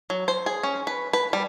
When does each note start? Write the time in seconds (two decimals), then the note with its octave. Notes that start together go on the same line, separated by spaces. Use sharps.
0.10 F#3
0.28 C5
0.46 G#4
0.63 C#4
0.87 B4
1.13 B4
1.33 G3